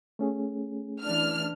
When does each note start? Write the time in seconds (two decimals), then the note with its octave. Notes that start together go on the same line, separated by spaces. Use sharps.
0.19 A3 C#4 G#4
1.03 E3 D4 F6